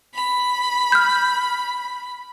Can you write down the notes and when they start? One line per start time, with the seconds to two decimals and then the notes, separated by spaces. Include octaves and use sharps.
0.14 B5
0.92 F6 G6